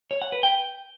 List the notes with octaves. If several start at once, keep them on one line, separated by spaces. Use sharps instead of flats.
C#5
F#5
B4
G5